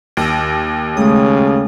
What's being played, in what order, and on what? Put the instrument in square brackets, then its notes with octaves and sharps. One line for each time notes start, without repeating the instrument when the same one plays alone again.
[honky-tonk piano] D#2 [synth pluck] E6 A#6 D7
[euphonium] C#3 [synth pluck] G#3 A3 D#6